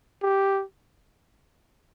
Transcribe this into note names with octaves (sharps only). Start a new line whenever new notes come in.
G4